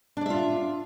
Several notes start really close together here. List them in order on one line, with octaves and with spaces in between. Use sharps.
D4 D5 E5 F4